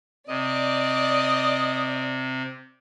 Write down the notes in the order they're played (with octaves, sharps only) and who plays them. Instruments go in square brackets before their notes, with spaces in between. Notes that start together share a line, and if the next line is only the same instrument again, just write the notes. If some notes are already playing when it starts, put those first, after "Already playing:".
[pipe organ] C3 [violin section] D5 [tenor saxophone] D#5